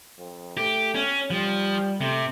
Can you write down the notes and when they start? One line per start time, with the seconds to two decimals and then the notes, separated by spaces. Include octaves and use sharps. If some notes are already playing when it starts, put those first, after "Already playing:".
0.18 F2
0.57 A3 G4
0.95 C#4
1.31 F3 G3
2.01 C3 A3